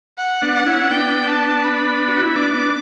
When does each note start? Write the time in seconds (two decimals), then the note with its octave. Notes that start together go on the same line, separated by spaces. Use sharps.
0.18 F#5
0.42 B3 D4
0.54 F#5
0.66 C#4 E4
0.90 B3 D4 G5
1.27 A5
1.64 B5
2.08 F#4
2.22 E4
2.35 B3 D4 D6
2.54 B3 D4